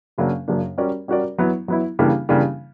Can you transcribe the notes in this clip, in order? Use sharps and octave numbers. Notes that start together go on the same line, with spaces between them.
F#2 C#3 F#3 A#3 D4
F#2 C#3 F#3 A#3 D4
G3 C#4 F#4 A#4 D5
G3 C#4 F#4 A#4 D5
F#3 B3 E4
F#3 B3 E4
C#3 E3 G3 A#3 D4
C#3 E3 G3 A#3 D4